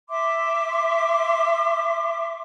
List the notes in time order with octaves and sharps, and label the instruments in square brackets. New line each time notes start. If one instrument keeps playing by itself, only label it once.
[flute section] E5 C6 D6